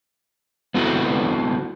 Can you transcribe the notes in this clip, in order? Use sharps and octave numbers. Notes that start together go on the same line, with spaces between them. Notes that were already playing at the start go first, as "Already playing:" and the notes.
B3 C4 E4 F#4 A4 B4